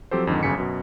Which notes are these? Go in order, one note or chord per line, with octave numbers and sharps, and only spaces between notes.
F3 F#3 C4 G4 A4 C5
F2 G#2 D3 D#3
G1 F#2 C#3 G#5 B6 C#7
F#2 B2